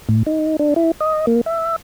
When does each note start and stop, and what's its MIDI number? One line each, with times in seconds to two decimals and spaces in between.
0.09 0.23 45
0.26 0.57 63
0.59 0.74 62
0.76 0.91 64
1.01 1.26 75
1.27 1.41 58
1.46 1.76 76